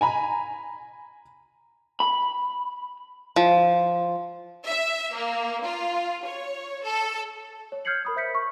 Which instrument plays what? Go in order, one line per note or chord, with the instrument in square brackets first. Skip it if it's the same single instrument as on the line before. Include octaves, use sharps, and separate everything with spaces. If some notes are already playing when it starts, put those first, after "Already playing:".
[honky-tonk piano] G#5 A#5 B5
[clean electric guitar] B5
[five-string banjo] F3
[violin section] E5
A#3
F4
C#5
A4
[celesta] C#5
F6 G6 G#6 C7 C#7 F#7
A#4 B5 D#6
C5 E5 G6 B6 C#7
C#6